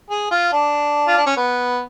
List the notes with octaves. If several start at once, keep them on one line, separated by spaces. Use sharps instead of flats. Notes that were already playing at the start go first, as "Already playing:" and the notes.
G#4
F4
D4
F4
D4
C#4
B3